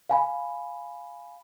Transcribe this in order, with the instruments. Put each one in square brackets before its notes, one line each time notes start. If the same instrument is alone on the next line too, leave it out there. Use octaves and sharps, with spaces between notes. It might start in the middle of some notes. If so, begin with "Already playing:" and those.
[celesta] F5 G#5 B5